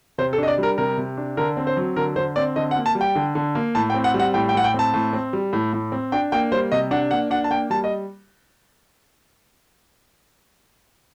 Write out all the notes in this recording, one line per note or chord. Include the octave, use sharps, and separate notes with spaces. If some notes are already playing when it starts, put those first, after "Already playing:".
C3 C5
A4
D4 D#5
D5
G3 A#4
C3 A#4
C3
D4
D3 A#4
C4
C5
F#3
D3 A#4
D3 C5
C4 D5
D3 D#5
F#5
A#3
A5
G3
G5
D3
D3
A#3
A2 A5
G5
C4
F#5
G3
F#5
A2 G5
G5
A2 F#5
G5
C4 A5
A2
C4
G3
A2
A2
C4
D4 G5
A#3 G5
G3 C5
C3 D#5
D4 F#5
A#3 F#5
D4 F#5
A5
A#3 G5
G3 A5
D#5